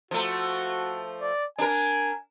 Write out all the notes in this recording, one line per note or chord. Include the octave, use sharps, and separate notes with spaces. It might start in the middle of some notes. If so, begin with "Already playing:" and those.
F3 A3 F#4
D5
D4 A#4 G#5